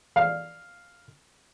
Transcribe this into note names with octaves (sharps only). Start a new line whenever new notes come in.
F5